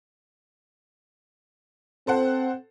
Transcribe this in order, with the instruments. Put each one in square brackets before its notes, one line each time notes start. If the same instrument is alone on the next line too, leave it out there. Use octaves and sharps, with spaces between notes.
[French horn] C4 [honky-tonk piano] A4 C5 F#5